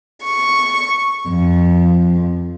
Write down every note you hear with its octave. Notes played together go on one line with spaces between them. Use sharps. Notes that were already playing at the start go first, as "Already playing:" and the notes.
C#6
F2